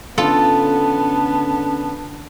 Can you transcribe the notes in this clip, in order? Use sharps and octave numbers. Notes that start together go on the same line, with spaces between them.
D3 B3 C#4 F4 A4 A5